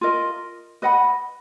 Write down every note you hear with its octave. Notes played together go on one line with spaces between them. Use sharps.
F4 A#4 D#5
B4 D#5 F#5 B5